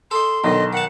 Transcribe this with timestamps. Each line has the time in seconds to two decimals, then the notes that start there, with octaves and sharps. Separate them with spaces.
0.11 A4 D#5 C6
0.44 B1 D3 D#3 D#5
0.73 D#3 F#5 A5